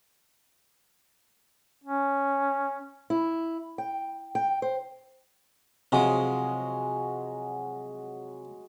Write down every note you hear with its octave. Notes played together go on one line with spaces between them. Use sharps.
C#4
E4
G5
G5
C5
C3 F3 F#3 G#3 D#6